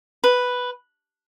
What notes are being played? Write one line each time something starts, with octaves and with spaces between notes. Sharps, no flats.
B4